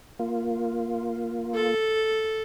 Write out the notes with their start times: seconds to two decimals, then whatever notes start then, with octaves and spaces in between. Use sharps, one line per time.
0.19 A#3 F4
1.55 A4